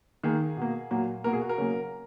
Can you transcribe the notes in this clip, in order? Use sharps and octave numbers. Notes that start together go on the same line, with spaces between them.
D#3 A#3 G#4
B2 A#3
A#2 F#3 A#3
B2 A#3 A#4
G#4
F#4
A#4
C#3 F#3 A#3